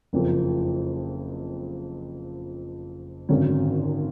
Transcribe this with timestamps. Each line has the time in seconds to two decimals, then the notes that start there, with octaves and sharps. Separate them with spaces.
0.13 F#1 F2 F3
3.29 G#1 F#2 D3 F#3 C#4